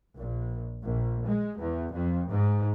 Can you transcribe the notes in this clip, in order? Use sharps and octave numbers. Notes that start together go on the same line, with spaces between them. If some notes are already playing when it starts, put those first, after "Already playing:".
A#1
A#1
G#3
E2
F2
G#2